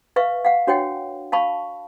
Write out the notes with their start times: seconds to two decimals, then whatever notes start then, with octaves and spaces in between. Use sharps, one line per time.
0.16 B4 E5 F5 C#6
0.45 F5 F#5
0.67 D4 F#4 C#5 F#5 G5
1.32 F5 A5 B5 C#6